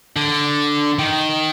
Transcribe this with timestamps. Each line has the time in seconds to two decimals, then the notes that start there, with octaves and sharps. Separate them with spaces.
0.17 D3
0.99 D#3